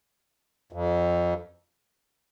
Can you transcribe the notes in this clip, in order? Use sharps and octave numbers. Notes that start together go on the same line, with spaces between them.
F2